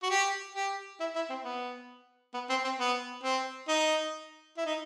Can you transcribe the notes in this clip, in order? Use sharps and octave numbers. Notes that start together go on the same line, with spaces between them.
F#4
G4
G4
E4
E4
C4
B3
B3
C4
C4
B3
C4
D#4
E4
D#4